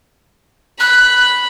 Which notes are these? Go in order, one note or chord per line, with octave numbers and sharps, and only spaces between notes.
B5 F#6